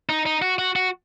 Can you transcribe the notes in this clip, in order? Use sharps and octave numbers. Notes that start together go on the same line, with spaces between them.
D#4
D#4
F#4
F#4
F#4